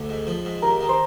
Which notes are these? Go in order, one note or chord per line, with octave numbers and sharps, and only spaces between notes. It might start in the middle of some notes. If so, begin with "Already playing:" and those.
Already playing: D2
G#2
F3
G#2
D#2 A#4
D#3
C5